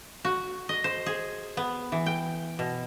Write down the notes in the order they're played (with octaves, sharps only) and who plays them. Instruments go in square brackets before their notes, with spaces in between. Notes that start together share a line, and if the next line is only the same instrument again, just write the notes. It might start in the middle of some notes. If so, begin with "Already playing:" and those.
[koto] F#4
D#5
C5
G#4
B3
E3
G5
B2